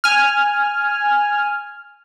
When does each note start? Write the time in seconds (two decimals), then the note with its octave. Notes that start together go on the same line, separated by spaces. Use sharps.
0.04 G#5 F6